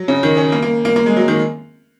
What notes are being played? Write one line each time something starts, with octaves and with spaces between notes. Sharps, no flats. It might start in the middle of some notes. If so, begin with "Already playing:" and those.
Already playing: F#3
C#3
D#3
C#4
A#3
A#3
A#3
A#3
G#3
F#3
D#3